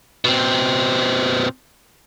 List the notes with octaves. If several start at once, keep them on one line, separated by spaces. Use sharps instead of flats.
B2 C4